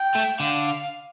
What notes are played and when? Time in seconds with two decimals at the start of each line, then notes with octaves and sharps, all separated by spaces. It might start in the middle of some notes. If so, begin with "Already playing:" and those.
Already playing: G5
0.15 A3
0.40 D3 F5